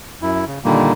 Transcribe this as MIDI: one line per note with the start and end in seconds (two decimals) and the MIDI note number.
0.22 0.45 42
0.22 0.45 64
0.47 0.59 49
0.64 0.92 46
0.64 0.92 50
0.64 0.92 51
0.64 0.92 55
0.64 0.92 58